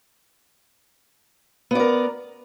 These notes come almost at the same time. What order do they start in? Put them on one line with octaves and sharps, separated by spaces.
B3 D5 A#4